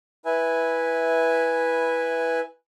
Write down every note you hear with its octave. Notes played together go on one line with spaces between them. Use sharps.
E4 B4 E5 G#5